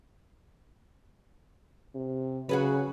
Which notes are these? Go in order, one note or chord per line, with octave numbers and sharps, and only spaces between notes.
C3
C#3 F#3 F#4 G#4 B4